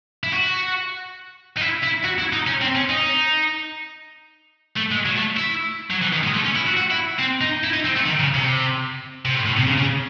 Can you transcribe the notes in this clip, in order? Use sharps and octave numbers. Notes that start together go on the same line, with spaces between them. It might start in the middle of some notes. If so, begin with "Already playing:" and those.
E4
F#4
D#4
E4
E4
F#4
E4
D#4
C#4
C4
C#4
D#4
A3
G#3
F#3
A3
E4
F#3
E3
D#3
G#3
A3
C#4
E4
F#4
F#4
E4
C4
D#4
E4
D#4
C4
A3
D#3
C#3
C3
C3
A2
A2
C3
C#3
C#3